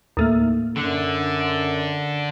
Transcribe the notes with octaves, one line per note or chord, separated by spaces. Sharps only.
D#2 A2 A#3
F#2 D3